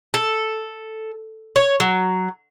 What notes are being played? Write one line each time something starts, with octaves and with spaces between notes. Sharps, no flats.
A4
C#5
F#3